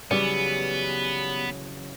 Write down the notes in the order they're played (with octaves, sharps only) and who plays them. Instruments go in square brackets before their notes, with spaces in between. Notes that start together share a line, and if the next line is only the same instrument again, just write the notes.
[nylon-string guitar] C#3 E3 F#3 [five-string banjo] G3 [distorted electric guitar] B3